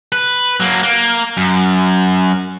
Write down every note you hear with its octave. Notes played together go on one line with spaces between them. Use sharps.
B4
F#3 A#3
A#3
F#2